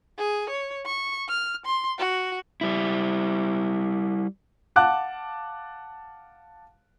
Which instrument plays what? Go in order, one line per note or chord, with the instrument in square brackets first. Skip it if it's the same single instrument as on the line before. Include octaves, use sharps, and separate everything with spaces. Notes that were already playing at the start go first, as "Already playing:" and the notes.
[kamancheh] G#4
C#5
C#6
F6
C6
F#4
[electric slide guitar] G3 E4
[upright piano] F5 F#5 A5 D6 F#6